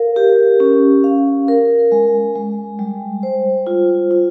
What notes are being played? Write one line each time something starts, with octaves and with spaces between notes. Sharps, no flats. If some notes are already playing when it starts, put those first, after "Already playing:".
Already playing: A#4 F5
G4
C#4
F5
A#4
G#3
G#3
G3
C5
F4
F4